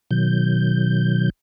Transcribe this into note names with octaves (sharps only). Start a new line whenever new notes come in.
B2 D#3 F#3 G6